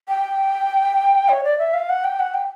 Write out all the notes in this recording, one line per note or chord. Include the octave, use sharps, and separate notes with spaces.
G5
C#5
D5
E5
F5
F#5
G5
F#5
G5